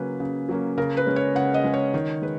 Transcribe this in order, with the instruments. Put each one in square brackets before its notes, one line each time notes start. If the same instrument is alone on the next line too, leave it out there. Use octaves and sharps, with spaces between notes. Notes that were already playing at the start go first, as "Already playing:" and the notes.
Already playing: [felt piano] C#3 F#3 A#3 C#4 B4
C#3
F#3 A#3 C#4
C#3 A#4
B4
G#3 C#4
C#5
C#3 F#5
D#5
G#3 C#4
C#5
D#3 C#5
G#3 B4